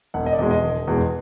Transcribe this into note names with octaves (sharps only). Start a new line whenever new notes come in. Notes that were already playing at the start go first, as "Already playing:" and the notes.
E1 F#5
D#5
D5
E2 B2 G#3 D#5
D#5
E1
E2 B2 G#3